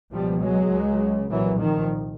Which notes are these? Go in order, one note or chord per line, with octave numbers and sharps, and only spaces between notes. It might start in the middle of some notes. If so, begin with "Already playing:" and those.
C#2 B2 F3 G3
F#3 G#3
C#2 C#3
C2 A#2 E3 F#3
D#3 F3